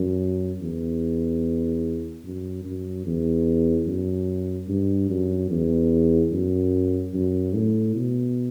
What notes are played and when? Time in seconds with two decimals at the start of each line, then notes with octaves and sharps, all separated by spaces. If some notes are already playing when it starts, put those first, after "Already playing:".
Already playing: F#2
0.61 E2
2.25 F#2
2.65 F#2
3.06 E2
3.87 F#2
4.68 G2
5.10 F#2
5.51 E2
6.32 F#2
7.14 F#2
7.54 A2
7.96 B2